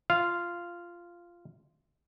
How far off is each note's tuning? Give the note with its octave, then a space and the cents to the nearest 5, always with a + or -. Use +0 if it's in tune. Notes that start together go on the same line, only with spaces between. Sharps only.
F4 -10 F5 -5